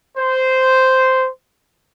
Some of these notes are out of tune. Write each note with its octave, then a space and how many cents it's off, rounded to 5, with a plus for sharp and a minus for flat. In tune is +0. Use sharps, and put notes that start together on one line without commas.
C5 -10